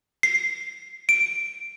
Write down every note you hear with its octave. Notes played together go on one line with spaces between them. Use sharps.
C7
D7